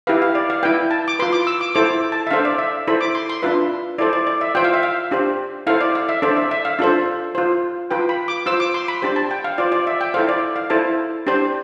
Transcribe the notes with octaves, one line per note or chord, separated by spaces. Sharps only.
E4 G4 B4 F5
F5
D5
F5
E4 B4 G5
A5
D6
F4 B4 C6
D6
E6
D6
E4 A4 C5 D6
A5
E5
D4 A4 C5 F5
D5
E5
E4 A4 C5 B5
D6
C6
C6
D4 F4 B4 E5
E4 A4 C5 D5
D5
D5
E5
F4 C5 G5
F5
E5
F5
D4 G4 C5
E4 A4 C5 F5
D5
F5
E5
D4 A4 C5 D5
E5
E5
F5
D4 F4 A4 C5
F4 C5
F4 B4 G5
B5
D6
F4 C5 E6
D6
C6
B5
D4 G4 C5
A5
G5
F5
F4 C5 D5
D5
E5
G5
E4 A4 C5 F5
D5
F5
E4 A4 C5 A5
D4 G4 C5